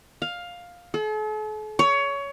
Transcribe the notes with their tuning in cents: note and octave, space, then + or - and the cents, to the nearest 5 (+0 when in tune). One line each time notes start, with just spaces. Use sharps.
F5 +10
A4 -45
C#5 +20